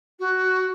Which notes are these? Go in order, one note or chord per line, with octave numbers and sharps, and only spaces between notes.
F#4